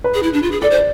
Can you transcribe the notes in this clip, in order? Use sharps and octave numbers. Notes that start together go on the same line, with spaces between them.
B4
G#4
E4
D4
F4
G#4
A4 D5
C5